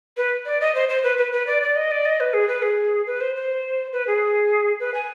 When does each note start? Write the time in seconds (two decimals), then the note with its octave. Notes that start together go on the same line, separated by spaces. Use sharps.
0.17 B4
0.46 D5
0.61 D#5
0.75 C5
0.89 C5
1.04 B4
1.18 B4
1.32 B4
1.47 D5
1.62 D5
1.76 D#5
1.91 D5
2.05 D#5
2.20 B4
2.34 G#4
2.48 B4
2.62 G#4
3.07 B4
3.21 C5
3.36 C5
3.93 B4
4.07 G#4
4.80 B4
4.94 G#5